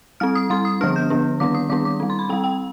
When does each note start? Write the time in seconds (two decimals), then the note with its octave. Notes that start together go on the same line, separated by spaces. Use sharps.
0.20 G3 C4 F6
0.35 D#6
0.50 G3 C4 C6
0.65 D#6
0.81 D3 F3 B3 D4 F6
0.96 G6
1.10 D3 F3 B3 D4
1.40 D#3 G3 B3 D4 D6
1.55 D#6
1.69 D#3 G3 B3 D4 D6
1.85 D6
2.00 G3 C4
2.10 C6
2.19 B5
2.29 G3 C4 G5
2.44 G5